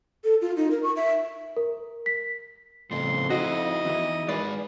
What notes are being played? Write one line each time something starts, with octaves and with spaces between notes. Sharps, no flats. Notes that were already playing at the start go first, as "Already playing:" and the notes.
A4
F4
D#4
A#4
C#6
E5
A#4
B6
F2 A2 C#3 C6
D#4 E4 F#4 D#5
E2 E3
G#3 D#4 G#4 A#4 B4 D5